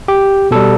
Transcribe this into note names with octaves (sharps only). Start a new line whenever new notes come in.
G4
B2 G3 A4